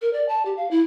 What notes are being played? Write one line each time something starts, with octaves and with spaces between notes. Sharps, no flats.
A#4
D5
A5
G4
F5
E4